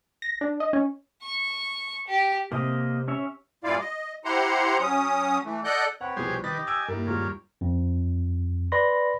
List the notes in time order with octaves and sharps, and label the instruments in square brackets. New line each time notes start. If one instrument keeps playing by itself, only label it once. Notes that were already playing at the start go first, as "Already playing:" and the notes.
[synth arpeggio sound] A#6
D4
D#5
C#4
[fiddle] C#6
G4
[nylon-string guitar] C3 [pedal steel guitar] A#3 C5 D#5
[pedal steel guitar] C#4 C#5 E5
[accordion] G2 A#2 E4 F4 D5 F5
D#5
E4 G4 C5 F#5 A#5 C6
F#3 C#4 D#6
E3 A3
A4 D5 D#5 F#5 F#6 G6
[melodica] C4 B4 C#5 [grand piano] F#5 B5
[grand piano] C2 B2 F3 [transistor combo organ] G4 G#4 C5
[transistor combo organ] D#3 B4 [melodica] G4 D#5 [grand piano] A6
[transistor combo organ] G#5 [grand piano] E6 D7
[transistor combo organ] G2 [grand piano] A#3 E4 A#4
[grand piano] D#1 G#3 F4 [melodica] A#4 C#5
[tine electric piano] F2
B4 D5 B5 C6 A#6